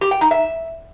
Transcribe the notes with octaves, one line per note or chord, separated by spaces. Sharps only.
G4
G5
D#4
E5